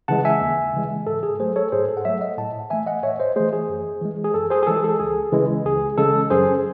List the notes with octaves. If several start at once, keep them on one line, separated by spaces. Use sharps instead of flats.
C#3 E3 G#3 F#5 A5
E5 G#5
D#2
C#3 E3 G#3
G#2 A4
G#4
F#3 A3 G#4 C5
A4 C#5
G#2 G#4 C5
A4
F#5
F#3 A3 C#5 E5
D#5 F#5
A2 F#5 A5
E3 A3 E5 G#5
D#5 F#5
A2 C#5 E5
C5 D#5
E3 A3 G#4 C5
G#4
F#2
E3 G#3
G#4
F#2 A4
G#4 C5
G#4
E3 G#3 A4
G#4
A4
C#2 G#4
C#3 E3 G#3
C#2 G#4
C#3 E3 G#3 A4
F#2 G#4 C5